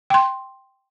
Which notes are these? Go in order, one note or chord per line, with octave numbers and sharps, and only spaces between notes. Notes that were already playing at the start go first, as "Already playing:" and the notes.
G5 C6